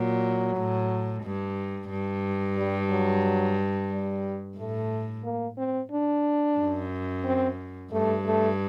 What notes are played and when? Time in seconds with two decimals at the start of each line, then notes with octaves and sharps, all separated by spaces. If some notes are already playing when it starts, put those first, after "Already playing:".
Already playing: A#2 F#3
0.57 A2
1.24 G2
1.90 G2
2.58 G3
2.90 F#3
3.91 G3
4.57 A2 A3
5.24 A#3
5.58 C4
5.92 D4
6.58 F#2
7.25 C4
7.92 G2 A3
8.26 A3